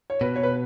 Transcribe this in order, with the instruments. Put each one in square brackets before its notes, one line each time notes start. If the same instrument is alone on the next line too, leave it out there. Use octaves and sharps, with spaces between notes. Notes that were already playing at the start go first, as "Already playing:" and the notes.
[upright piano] C#5
[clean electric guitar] B2 [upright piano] B4
[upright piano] C#5
B4